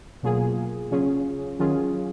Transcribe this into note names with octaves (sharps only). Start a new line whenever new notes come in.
B2 F#3 A#3 F4 G#4
C#3 F#3 C#4 F4 G#4
D#3 F#3 C#4 F4 G#4